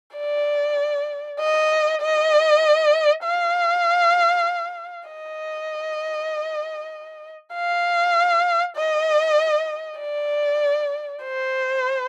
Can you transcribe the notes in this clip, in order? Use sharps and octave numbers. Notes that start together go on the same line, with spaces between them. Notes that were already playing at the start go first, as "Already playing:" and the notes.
D5
D#5
D#5
F5
D#5
F5
D#5
D5
C5